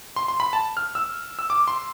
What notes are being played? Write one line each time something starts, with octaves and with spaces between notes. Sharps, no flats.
C6
C6
B5
A5
F6
E6
E6
D6
C6